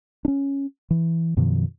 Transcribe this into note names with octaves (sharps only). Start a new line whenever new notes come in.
C#4 D4
E3
F#2 B2 D#3 F3